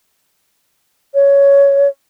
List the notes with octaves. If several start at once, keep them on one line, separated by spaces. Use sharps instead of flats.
C#5